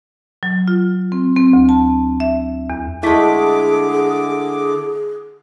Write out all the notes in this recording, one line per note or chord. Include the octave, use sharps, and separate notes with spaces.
F#3
F4
C4
C4
D2
A5
E5
E2
D3 G#3 A3 E4 G#4 D6 B6